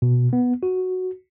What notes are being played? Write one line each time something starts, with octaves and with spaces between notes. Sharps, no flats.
B2
B3
F#4